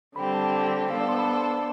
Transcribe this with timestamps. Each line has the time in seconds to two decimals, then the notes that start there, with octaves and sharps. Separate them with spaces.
0.16 D3 G3 C4 G4 B5
0.34 A5
0.53 G5
0.90 B3 D4 A4 C5 F5
1.00 D5
1.09 C6
1.18 B5
1.27 A5